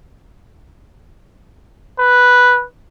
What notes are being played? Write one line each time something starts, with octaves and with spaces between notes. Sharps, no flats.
B4